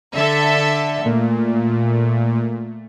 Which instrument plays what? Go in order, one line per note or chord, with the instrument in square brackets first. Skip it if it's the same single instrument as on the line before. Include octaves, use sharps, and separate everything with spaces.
[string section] D3 A4 E5
[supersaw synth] A#2 [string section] A3